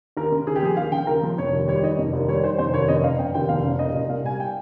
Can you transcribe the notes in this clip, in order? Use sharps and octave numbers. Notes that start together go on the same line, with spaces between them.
D#2 A#4
C#3
D#2 G#4
G4
F3 G#4
D#2 F5
C#3 G5
D#2 A#4
F3
F1 C#5
D#2
G3 C#5
D#3 D#5
F1
D#2
G3 C#5
D#3 C5
F1 C5
D#2 C#5
F1 D#5
C#3 F5
F1 G5
D#2 G5
F1 F5
C#3
C2 D#5
A#2
C2 F5
G3 G#5
G5